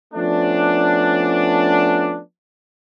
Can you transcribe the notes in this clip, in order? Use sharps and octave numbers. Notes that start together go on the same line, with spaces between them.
F3 A3 B3 C#4 D4